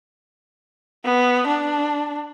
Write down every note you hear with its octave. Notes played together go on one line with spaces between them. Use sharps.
B3
D4